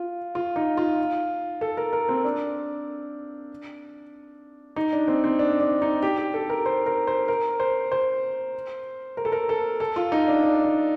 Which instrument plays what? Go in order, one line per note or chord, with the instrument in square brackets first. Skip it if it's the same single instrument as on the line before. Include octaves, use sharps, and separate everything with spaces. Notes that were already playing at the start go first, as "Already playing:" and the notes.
Already playing: [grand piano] F4
F4
D#4
F4
A4
A#4
A#4
C4
D4
D#4
D4
C4
C4
D4
D4
D#4
G4
G4
A4
A#4
C5
A#4
C5
A#4
C5
C5
A#4
A4
A#4
A4
A4
F4
D#4
D4
D4
D4